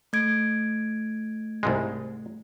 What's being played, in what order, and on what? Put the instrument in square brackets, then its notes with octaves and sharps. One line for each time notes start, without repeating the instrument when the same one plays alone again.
[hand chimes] A3 G#6 D7
[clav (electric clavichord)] C2 G#2 G#3